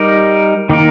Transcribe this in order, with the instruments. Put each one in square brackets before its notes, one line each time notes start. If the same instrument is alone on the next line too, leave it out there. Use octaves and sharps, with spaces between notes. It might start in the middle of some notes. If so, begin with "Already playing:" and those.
Already playing: [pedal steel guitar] G3 D#4 A#4
D#3 A#3 D#4 A#4